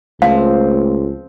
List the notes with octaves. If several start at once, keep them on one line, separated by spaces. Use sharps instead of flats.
C#2 F3 A3 C4 F5